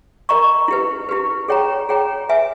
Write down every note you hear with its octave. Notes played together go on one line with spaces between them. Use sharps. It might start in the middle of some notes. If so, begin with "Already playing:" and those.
A#4 D#5 A#5 C#6
E4 G4 B4
E4 G4 B4
G#4 C#5 G5 A#5
G#4 C#5 G5 A#5
B4 E5 G#5